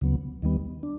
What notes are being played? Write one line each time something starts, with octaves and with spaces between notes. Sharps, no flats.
D2 C#3 F#3 B3
D#2 D#3 G3 B3
D4